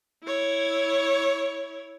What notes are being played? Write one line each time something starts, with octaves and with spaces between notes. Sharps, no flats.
E4 C#5